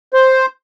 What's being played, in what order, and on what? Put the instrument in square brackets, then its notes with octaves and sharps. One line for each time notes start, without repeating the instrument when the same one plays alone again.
[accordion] C5